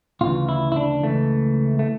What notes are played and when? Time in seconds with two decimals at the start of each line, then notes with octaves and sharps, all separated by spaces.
0.21 D2 C#3 E3 F4
0.49 E4
0.72 E4
0.76 D4
1.03 C#2 C#3 E3 A3
1.79 A3